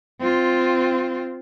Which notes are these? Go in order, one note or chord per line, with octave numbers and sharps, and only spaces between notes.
C4 F4